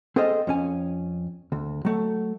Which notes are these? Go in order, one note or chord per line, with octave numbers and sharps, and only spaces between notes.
C4 G#4 A4 C5 D#5 F5
F2 C#4 G#5
D2
F#3 A3